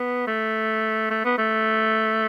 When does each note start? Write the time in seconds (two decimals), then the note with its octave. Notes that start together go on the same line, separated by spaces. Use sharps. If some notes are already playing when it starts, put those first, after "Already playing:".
Already playing: B3
0.27 A3
1.11 A3
1.25 B3
1.38 A3